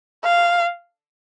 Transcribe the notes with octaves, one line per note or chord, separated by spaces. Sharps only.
F5